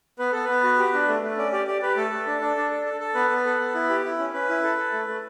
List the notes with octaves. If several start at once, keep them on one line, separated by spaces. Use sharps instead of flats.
B3 B4
B3 A4
B3 B4
F#4
G4
D4
A3
A3
C#4 D5
G4 D5
G4 D5
G4 B4
A3 A4
A3
D4
D4
D4
A4
A4
A4
B3 B4
B3
A4
B3
E4
G4
E4
C#4
C#4 B4
E4
A4
A4
A3
A3